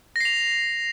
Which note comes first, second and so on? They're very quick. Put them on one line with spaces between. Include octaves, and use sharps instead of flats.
A#6 C7 F7